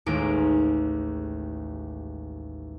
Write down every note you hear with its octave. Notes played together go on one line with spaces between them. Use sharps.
A1 D#2 G#3 D7